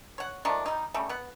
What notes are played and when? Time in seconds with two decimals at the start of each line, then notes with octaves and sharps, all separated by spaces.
0.18 C#5 F#5
0.45 D#3 F3 A3 D4
0.66 G3 D#4
0.94 C#3 G3 A3
1.09 B3 F#5